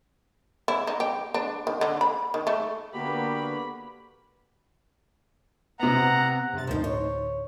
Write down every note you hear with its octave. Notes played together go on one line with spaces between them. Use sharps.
E4
D#4
G4
D4
D#3
D3
B5
D#3
A3
D3 A#3 B3 F#4 G4 B4 B5
C3 B3 F#5 A#5
G2 C3 A6
D2 A2 F3 D#4 C5
C#5